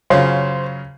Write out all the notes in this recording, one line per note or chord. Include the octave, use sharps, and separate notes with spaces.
F#2 C#3 F4 C5 C#5